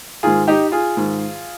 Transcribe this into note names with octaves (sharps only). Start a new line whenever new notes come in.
G#2 D#3 F4 G#4
D#4 G4
F4 G#4
G#2 D#3